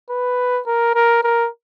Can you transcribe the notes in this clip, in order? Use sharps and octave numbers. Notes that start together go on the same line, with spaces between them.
B4
A#4
A#4
A#4